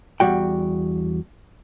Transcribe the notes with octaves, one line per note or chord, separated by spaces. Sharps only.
E2 D#3 G3 F#4 G5